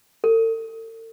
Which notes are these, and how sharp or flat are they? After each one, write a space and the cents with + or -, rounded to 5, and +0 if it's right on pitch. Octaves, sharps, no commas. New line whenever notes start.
A4 +45